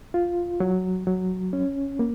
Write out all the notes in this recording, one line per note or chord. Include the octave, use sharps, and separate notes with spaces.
F4
F#3
F#3
C#4
A#3